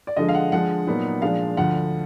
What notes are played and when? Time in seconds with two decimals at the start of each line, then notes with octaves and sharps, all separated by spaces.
0.07 D5
0.16 D3 F3 G#3 D#5
0.29 F5
0.34 F#5
0.51 D3 F3 G#3 D4 F#5
0.87 A#2 F#3 B3 D#4
1.22 A#2 F3 G#3 D4 F5
1.57 D2 D3 F3 F#5